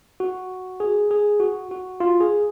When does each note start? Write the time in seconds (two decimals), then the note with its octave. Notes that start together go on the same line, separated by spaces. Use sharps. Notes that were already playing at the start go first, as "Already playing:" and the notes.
0.20 F#4
0.80 G#4
1.11 G#4
1.40 F#4
1.71 F#4
2.00 F4
2.21 G#4